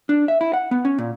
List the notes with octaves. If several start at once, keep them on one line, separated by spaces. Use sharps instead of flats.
D4
E5
E4
F#5
B3
C#4
A#2